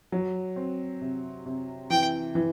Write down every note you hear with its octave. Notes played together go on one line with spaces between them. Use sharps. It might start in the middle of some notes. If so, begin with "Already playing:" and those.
F#3
C4
C3
C3
E3 G5
E3